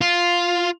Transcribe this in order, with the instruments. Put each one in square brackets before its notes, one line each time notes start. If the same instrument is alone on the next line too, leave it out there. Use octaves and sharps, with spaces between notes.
[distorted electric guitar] F4